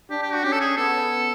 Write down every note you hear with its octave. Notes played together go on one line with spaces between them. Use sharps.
D4 G4
G4
F#4
C#4 G4
A4
G#4
B3 A4